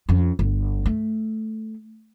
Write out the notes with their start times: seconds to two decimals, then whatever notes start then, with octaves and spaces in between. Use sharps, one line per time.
0.09 F2 C#4
0.39 G1
0.86 A3